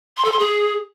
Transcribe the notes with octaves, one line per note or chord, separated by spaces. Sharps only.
C6
A4
C6
G#4